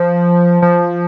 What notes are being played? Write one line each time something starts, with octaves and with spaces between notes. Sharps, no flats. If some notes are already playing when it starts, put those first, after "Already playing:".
Already playing: F3
F3